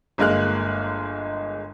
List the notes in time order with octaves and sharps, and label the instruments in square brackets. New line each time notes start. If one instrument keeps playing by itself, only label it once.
[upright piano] G1 G#3 A#3 F6 F#6